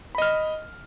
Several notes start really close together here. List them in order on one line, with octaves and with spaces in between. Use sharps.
B5 D#5 F6